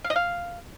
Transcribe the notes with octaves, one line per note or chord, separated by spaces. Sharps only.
F5
D#5
F5